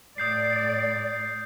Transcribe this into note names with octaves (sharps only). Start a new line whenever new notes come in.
A2 D5 D#6 G6 C7